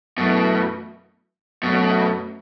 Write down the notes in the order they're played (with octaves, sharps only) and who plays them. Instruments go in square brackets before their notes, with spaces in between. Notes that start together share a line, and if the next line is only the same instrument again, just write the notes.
[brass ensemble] F#2 E3 A3 [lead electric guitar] B2
[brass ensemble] F#2 F#3 A3 [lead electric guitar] B2